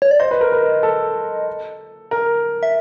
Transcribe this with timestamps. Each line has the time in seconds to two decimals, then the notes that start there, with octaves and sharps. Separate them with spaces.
0.02 C#5
0.11 D5
0.20 C5 D#5
0.31 B4
0.41 A#4
0.52 B4
0.83 A4
2.11 A#4
2.63 E5